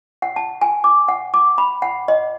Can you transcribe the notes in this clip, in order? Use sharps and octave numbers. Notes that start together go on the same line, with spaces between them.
F#5
A5
G#5
D6
F#5
D6
B5
F#5
D#5